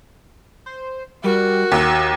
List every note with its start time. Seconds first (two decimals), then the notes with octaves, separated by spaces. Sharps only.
0.66 C5
1.24 G3 F#4 A#4
1.72 D#2 E6